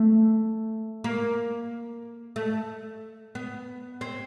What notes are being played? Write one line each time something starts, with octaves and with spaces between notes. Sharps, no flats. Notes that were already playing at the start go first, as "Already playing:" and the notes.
Already playing: A3
A#3
A3
B3
C4